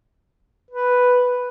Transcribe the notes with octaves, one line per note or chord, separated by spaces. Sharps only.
B4